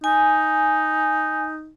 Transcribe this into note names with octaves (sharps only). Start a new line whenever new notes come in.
D#4 G#5